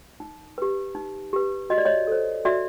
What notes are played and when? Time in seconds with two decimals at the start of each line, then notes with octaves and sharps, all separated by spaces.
0.20 D#4
0.58 G4 B4
0.95 D#4
1.33 G4 B4
1.70 F#4 D#5
1.78 D5
1.85 C#5 D#5
2.07 A4 C5
2.45 F#4 D5 E5